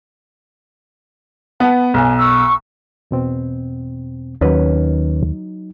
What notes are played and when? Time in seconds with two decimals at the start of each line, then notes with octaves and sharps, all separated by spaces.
1.60 B3 A5
1.94 B1 G#5
2.16 C#6 E6
3.11 E2 B2 C4
4.41 D#2 F#3 C#4 D#4 B4